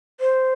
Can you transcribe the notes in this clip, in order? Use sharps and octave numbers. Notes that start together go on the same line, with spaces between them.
C5